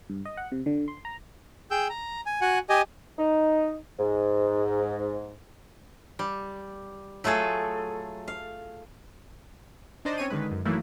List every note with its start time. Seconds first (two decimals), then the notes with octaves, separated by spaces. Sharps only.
0.10 G2
0.25 D#5
0.37 F#5
0.52 C3
0.66 D3
0.88 C6
1.05 A#5
1.71 G#4 G5 E6 G6
1.90 A#5
2.26 G#5
2.41 F#4 F#5 G#5
2.69 G4 D#5 G#5
3.19 D#4
3.99 G#2
6.19 G3
7.24 F#3 A3 F4 G#4 A4
8.28 F5
10.05 D4 D#4 C5 D5 D#5
10.18 C4 C#4 C#5 G#5 D#7
10.30 D3 D#3 G#3 B4
10.51 F#2
10.65 D#3 E3 F#3 A3 A#3 E4